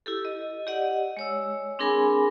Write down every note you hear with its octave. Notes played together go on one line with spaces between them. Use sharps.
E4 G4 A4
D#5
G4 D5 D#5 F#5
G#3 C#5 E6
C4 D4 G#4 A#4 G#5 B5